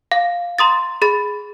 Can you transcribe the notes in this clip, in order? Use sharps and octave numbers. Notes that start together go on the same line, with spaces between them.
F5
A#5 C6 D#6 A6
G#4 B5 A6